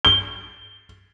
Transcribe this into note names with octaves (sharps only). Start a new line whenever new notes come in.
G7